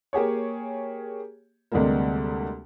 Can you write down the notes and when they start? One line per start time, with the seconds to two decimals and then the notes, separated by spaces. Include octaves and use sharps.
0.13 A#3 G4 G#4 C#5
1.72 D2 C3 G3 G#3 A#3